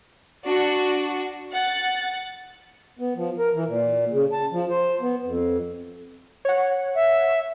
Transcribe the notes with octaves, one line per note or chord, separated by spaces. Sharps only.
D4 F#4
F#5 A6
B3
F3
A#4
E3
A#2
C#3
A5
F3
C5
B3
F2
C#5 F#5
E5